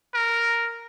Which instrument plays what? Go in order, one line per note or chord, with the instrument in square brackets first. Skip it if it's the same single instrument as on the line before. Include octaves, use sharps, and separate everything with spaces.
[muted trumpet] A#4